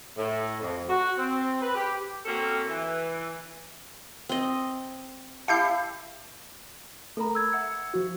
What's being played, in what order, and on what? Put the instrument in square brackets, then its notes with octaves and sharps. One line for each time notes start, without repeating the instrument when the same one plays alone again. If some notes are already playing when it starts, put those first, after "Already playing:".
[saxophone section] A2
F2
F#4
C4
B4
G4
[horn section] A#3 C4 C#4 F#4 A4
E3
[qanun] C4 D#5
[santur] E4 G4 E5 [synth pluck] F5 G6 C7 [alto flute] A5
[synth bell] A3 A#4 B5 [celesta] A4 A#5
[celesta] E6 G#6
[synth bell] E5 F#5 C#7
F3 F#4